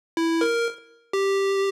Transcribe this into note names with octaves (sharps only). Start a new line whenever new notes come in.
E4
A#4
G4